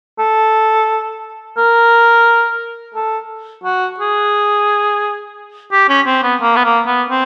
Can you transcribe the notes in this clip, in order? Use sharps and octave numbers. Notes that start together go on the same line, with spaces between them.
A4
A#4
A4
F#4
G#4
G4
C#4
C4
B3
A#3
B3
A#3
B3
C4